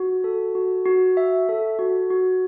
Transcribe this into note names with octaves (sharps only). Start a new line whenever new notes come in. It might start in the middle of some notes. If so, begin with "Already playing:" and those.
Already playing: F#4
A4
F#4
F#4
E5
A4
F#4
F#4